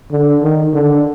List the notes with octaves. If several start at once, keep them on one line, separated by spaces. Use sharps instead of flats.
D3
D#3
D3